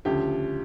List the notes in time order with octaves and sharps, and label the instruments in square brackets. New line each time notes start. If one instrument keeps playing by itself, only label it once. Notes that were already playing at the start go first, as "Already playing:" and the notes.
[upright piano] D2 C#3 F3 G4